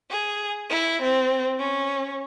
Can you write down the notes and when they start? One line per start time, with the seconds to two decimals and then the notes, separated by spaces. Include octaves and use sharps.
0.11 G#4
0.70 E4
1.02 C4
1.59 C#4